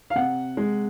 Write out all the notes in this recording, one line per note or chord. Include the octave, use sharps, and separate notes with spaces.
F5
C3 F#5
G#3